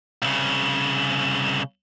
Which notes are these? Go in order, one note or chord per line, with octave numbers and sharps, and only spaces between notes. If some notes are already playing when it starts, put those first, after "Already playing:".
C2 C#3